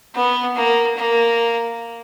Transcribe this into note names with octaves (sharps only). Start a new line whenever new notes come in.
B3
A#3
A#3